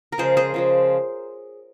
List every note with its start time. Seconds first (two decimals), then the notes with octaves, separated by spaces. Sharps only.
0.12 A#4
0.18 C#3 F3 G#3 G#4 C5
0.37 G#4 C5
0.54 C#3 F3 G#3